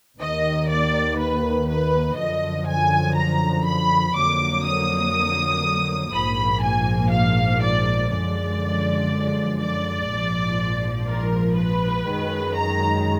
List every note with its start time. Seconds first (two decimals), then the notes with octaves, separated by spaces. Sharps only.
0.19 D#2 D#3 A#3 D#5
0.69 D5
1.18 B4
1.68 B4
2.17 F#2 D3 F3 D#5
2.67 G#5
3.16 A#5
3.66 B5
4.15 F2 D3 F#3 A#3 D6
4.65 D#6
6.13 A#1 G#2 F3 A#3 B5
6.62 G#5
7.11 F5
7.62 D5
8.11 F#2 D3 F3 G#3 D5
9.60 D5
10.09 A#1 G#2 F3
11.08 A#4
11.57 B4
12.06 F#2 D#3 G#3
12.56 A#5